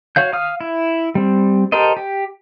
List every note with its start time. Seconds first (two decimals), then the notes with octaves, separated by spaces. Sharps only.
0.16 F#4 C#5 F5 G6
0.33 F5 D#6 F6
0.61 E4
1.15 G3 C4
1.72 G4 A4 A#4 C5 D#5
1.97 G4